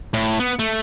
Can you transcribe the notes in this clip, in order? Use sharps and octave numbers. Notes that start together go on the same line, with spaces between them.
A2
B3
A3